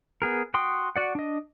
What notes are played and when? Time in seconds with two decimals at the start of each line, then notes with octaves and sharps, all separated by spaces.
0.22 B3 G#4 A#4
0.54 F#4 G5 C6 D#6
0.96 F#4 D5 F#5
1.15 D4 D#5